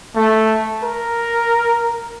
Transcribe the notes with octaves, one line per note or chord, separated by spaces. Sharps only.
A3
A#4